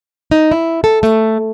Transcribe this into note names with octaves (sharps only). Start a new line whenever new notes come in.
D#4
E4
A4
A3